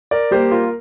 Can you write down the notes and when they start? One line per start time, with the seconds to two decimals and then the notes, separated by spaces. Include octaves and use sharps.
0.11 A#4 D5
0.31 G3 A#3 G4 C5
0.51 F4 A#4